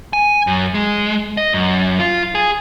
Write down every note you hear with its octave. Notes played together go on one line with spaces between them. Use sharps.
G#5
F#2
G#3
D#5
F#2
F4
G#4